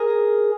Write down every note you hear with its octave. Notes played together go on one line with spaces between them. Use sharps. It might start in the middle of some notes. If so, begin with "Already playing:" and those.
Already playing: G#4 A#4